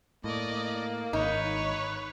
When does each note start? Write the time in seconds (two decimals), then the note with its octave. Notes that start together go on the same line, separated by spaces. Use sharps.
0.24 A2 A#3 D5 D#5
1.13 G#1 D#4 B4 C#5